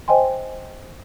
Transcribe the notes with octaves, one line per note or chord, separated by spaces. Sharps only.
C5 D#5 G5 G#5 C6